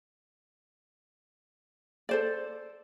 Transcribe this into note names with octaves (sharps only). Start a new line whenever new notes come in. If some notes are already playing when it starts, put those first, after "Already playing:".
A4 C5 D5